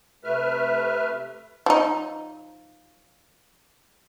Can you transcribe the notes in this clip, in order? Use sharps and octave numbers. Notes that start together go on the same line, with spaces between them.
C3 A3 B4 E5 F6
F3 D#4